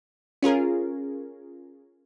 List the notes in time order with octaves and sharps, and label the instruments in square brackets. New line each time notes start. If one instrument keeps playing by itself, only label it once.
[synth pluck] C#4 F4 G#4 A#4